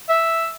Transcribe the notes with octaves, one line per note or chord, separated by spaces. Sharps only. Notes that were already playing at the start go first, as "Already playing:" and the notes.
E5